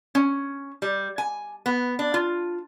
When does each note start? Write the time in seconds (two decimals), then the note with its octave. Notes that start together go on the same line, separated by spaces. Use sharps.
0.15 C#4
0.82 G3
1.18 G#5
1.66 B3
1.99 D4
2.14 F4